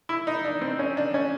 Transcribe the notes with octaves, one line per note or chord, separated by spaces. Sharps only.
E4
D#4
D4
C4
C#4
D4
C#4